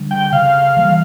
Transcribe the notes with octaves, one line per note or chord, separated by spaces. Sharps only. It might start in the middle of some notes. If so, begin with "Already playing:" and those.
Already playing: D3 G3 D4
G5
C#3 F5
E3 G3 A#3